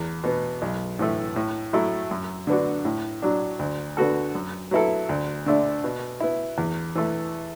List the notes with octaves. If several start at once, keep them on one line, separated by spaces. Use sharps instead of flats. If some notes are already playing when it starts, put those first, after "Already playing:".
Already playing: E2
B2 B3
B1
A2 E3 A3
A2
F#3 A3 E4
F#2
D3 B3 D4 F#4
A2
F#3 D4
D2
D3 B3 F#4 A4
F#2
F#3 B3 E4 A4
D2
D3 A3 D4
B2
B3 E4
E2
E3 A3